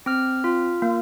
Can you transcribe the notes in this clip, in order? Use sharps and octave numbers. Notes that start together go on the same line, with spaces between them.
C4 F6
F4
A#3